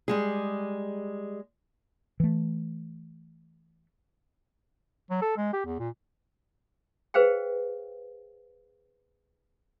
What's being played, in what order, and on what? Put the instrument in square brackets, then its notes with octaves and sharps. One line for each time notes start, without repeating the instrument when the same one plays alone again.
[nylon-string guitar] G3 G#3 G#4
[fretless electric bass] E3 A3
[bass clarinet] F#3
A4
G#3
G4
E2
A#2
[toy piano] G#4 B4 C5 F5 G5